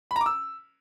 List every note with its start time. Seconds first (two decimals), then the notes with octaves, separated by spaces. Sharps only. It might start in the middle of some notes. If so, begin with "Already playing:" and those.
0.11 B5
0.16 A#5
0.21 D6
0.26 E6